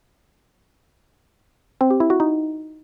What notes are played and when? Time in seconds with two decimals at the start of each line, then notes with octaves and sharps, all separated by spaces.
1.81 C4
1.90 G4
2.00 E4
2.10 F#4
2.20 D#4